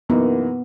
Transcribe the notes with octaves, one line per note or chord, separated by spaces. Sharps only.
F#2 E3 A#3 B3 D#4